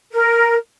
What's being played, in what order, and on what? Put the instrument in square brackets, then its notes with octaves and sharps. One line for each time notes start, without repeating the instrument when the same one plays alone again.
[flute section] A#4